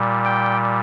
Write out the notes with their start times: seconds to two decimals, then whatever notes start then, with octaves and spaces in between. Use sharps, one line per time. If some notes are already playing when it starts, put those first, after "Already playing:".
Already playing: A#2 G3
0.25 G5